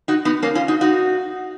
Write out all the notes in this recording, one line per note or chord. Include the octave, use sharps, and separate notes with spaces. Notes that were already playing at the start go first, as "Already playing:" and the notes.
D#4 F#4
B3 D#4
A#3 C#4
C#4 F4
D#4 F#4
D#4 F#4